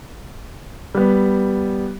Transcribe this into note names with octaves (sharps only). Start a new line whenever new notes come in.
G3 B3